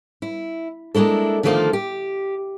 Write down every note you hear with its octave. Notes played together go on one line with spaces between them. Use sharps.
E4
G#3 A#3 D4 E4 A4
D3 D#3 F3 A3 A#3 F4
G4